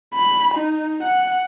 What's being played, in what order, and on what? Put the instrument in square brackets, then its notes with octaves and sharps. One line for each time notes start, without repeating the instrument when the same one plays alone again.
[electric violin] B5
D#4
F#5